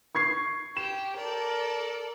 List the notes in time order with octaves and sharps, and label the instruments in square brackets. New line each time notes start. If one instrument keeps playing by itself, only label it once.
[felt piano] C#6 G#6 C7
[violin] G4 [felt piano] E7
[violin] A4 D5 [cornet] A#4